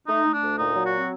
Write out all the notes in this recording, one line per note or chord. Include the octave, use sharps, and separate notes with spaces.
A3 D#4
A3
D4
D2
A#2 D#4
F#3
F#4
C4